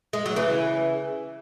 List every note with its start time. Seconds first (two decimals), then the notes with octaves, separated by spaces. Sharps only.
0.13 G#3
0.26 F#3
0.36 C#3 E3